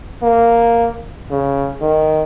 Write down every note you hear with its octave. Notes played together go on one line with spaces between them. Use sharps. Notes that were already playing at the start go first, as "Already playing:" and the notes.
A#3
C#3
D#3